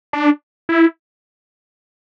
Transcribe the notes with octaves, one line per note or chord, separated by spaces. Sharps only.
D4
E4